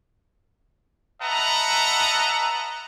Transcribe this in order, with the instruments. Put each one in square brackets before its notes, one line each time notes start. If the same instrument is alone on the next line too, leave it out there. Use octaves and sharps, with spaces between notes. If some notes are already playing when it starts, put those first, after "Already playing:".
[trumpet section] B4 D#5 E5 F#5 A5 A#5